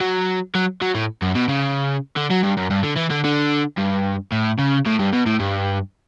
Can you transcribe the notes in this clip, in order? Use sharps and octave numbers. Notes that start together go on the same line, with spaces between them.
F#3
F#3
F#3
A2
F#2
B2
C#3
D3
F#3
G2
F#2
G2
D3
E3
D3
D3
G2
A2
C#3
A2
G2
B2
A2
G2